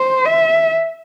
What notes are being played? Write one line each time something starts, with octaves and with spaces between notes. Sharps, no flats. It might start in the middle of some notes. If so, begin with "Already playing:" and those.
Already playing: C5
E5